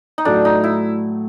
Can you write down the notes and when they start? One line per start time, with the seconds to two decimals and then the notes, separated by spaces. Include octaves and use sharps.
0.18 D#4
0.25 A2 F#3 A3 D4
0.45 D#4
0.64 E4